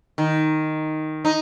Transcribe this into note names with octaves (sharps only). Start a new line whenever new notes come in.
D#3
D#4